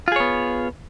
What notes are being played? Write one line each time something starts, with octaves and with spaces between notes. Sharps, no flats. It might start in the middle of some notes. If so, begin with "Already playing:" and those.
B3 F4 G#4 C#5